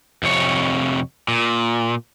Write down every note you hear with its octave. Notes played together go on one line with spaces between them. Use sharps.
F2 C3 C#5
A#2